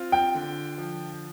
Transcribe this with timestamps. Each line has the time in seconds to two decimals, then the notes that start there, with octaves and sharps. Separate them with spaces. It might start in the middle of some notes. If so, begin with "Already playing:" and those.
Already playing: C4 F4
0.12 G5
0.35 D3
0.78 F3